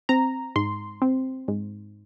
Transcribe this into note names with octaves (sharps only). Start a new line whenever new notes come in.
C4 A#5
G#2 C6
C4
G#2